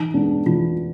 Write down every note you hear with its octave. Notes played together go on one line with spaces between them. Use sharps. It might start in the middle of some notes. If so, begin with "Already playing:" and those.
Already playing: E3 D#4
G#3 B3 D4
E3 F4